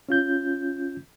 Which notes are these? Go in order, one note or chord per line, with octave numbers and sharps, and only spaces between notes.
C#4 F4 G6